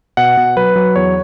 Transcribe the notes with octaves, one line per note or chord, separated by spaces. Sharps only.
B2 F#5
B2
F#3 B4
F#3
E2 C#5